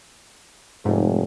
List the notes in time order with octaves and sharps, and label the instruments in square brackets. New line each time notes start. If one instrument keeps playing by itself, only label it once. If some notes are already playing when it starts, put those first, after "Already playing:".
[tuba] F1 [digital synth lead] G#2